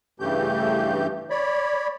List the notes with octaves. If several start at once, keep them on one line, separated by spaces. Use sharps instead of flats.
G2 C#3 E3 A3 G4 G6
C#5 D5 B5